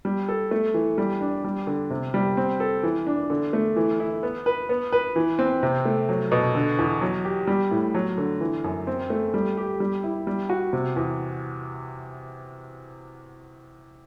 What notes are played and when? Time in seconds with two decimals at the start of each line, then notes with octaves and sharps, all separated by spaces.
0.05 G3
0.29 A4
0.51 A3
0.74 E3
0.98 G3
1.21 D4
1.44 G3
1.67 D3
1.90 C3
2.14 G3
2.37 C4
2.60 A4
2.83 E3
3.07 D4
3.30 D3
3.53 A3
3.76 E3
4.00 E4
4.23 B3
4.46 B4
4.69 B3
4.92 B4
5.16 E3
5.39 C4
5.63 C3
5.85 A3
6.09 F#3
6.32 B2
6.55 D3
6.79 E2
7.01 F#3
7.24 G4
7.47 G3
7.71 A2
7.95 F#3
8.18 D3
8.41 E3
8.64 F#2
8.87 C4
9.10 A3
9.34 G3
9.57 G4
9.80 G3
10.03 E4
10.27 G3
10.49 F#4
10.73 C3
10.96 E2